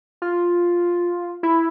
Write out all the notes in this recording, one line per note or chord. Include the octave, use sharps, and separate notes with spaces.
F4
E4